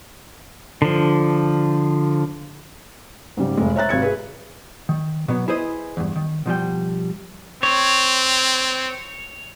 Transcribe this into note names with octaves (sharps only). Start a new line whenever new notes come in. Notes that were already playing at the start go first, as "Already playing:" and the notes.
D3 F3
G#2 C#3 G3
F1 G#3
C5 C#5 E5 A#5 F#6 A6
G#1 C3 G#6 C#7
G#4 B4
D#3
B2 F#3 B3
E4 G#4 B4 C5 D#5
E2 G2
D#3
B2 F3 G3 G5
C4 C#5